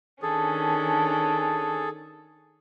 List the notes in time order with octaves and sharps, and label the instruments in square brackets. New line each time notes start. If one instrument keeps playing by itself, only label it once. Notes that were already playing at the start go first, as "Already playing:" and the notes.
[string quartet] D#3 C#4 D4 [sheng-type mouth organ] G#4 A4